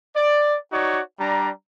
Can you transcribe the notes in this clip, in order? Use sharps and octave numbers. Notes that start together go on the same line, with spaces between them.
D5
D#4 F#4 C#5 D5
G3 D4 A#5